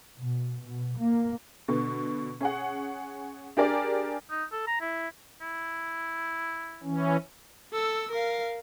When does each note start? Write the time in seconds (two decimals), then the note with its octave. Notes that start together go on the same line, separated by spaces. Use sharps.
0.17 B2
0.66 B2
0.98 A#3
1.68 B2 D3 B3
2.41 C#4 G#4 F#5
3.57 D4 G4 G#4 A#4 D5
4.30 D#4
4.52 A4
4.67 A#5
4.81 E4
5.41 E4
6.84 E3 C#4
7.74 A4 E6
8.11 A#4 F5